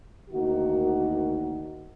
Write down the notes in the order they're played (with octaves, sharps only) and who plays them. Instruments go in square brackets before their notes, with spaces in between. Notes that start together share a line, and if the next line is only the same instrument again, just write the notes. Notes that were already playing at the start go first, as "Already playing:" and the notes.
[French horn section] D2 D#3 A#3 D#4 F#4